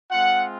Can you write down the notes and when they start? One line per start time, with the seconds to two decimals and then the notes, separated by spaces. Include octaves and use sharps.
0.11 G#3 C4 F4 F#5